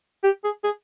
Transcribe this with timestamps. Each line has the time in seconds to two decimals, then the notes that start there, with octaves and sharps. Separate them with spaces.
0.24 G4
0.44 G#4
0.64 G#4